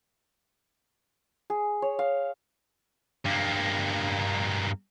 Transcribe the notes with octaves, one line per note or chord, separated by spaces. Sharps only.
G#4
C#5
F5
G2 A#3